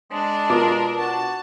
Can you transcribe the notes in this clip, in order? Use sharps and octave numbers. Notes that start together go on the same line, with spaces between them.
G#3 D4
B2 F4 A#4 D6
F#4 A5